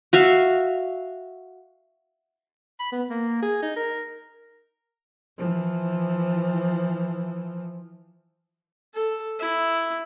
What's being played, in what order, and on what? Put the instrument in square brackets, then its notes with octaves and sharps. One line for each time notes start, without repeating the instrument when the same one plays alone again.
[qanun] F#4 E5 F5
[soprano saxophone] B5
B3
A#3
G#4
D#4
A#4
[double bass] E3 F3
[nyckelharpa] A4
E4